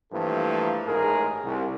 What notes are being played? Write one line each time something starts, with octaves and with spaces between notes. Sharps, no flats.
G2 E3 F3 A3 A#3 A4
A1 G#2 G#4 A#4
C2